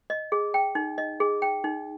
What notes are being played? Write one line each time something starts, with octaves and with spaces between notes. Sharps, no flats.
D#5
G#4
G5
D#4
D#5
G#4
G5
D#4